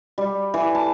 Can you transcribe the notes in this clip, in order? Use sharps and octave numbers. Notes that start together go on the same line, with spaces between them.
G3
E3
A5